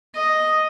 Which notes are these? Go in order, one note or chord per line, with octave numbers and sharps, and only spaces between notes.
D#5